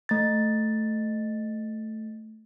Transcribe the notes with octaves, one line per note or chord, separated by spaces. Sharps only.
A3 A6